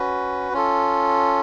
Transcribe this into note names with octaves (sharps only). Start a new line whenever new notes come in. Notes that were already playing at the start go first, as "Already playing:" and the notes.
Already playing: C#4 F#4 B4
C#4 F4 A4